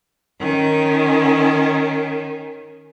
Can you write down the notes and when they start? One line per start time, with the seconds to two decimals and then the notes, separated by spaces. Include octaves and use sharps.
0.38 D#3 C#4